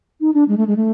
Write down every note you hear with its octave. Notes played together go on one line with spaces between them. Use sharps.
D#4
D4
G#3
A3
G#3
A3